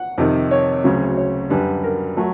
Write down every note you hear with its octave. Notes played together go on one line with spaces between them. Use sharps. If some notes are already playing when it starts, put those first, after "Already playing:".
Already playing: F#5
F2 C3 D#3
C#5
D2 C#3 F#3
C#5
F#2 D3 G3 B4
A#4
F#3 A3